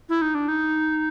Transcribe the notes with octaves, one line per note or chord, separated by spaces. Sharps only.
E4
D#4
D4
D#4